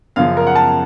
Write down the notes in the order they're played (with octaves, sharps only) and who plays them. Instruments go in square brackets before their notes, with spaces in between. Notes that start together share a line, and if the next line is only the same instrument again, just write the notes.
[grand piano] F#2 C#3 F3 F5
A#4
F#5
A5